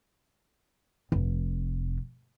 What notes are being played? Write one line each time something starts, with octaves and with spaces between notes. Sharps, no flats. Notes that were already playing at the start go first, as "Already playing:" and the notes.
F1